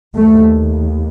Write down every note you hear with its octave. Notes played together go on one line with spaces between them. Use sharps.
D#2 A3